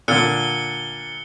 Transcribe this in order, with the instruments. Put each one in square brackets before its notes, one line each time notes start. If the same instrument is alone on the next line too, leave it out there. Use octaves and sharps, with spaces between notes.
[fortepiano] A#2 D3 [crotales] F#6 C#7 G7